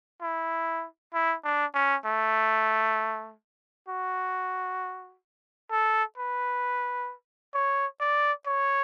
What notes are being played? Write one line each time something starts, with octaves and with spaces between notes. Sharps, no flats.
E4
E4
D4
C#4
A3
F#4
A4
B4
C#5
D5
C#5